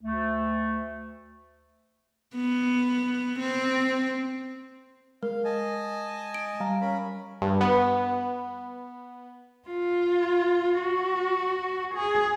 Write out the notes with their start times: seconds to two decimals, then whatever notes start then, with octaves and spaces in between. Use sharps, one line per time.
0.02 D2 A3
2.34 B3
3.39 C4
5.23 G#3 A#4 F5
5.45 D#5 G#5 A5
6.34 D7
6.60 G3 F5 A#5
6.81 C#4 A#4 B5
7.42 G2
7.61 B3
9.69 F4
10.80 F#4
11.95 G#4